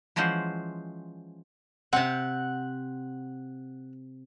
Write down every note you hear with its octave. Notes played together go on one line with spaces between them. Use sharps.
E3 F3 G#3 C#4 C5 F#5
C3 C4 F#5